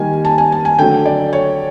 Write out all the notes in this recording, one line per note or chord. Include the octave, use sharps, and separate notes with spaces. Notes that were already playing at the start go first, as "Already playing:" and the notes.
Already playing: D#3 G3 A#3 G#5
A5
G#5
A5
G#5
D3 F#3 A3 G5
D5
C#5